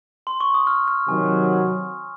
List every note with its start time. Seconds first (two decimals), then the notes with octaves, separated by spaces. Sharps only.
0.27 C6
0.41 C#6
0.54 D#6
0.67 F6
0.88 F6
1.08 C3 D#3 F#3 G#5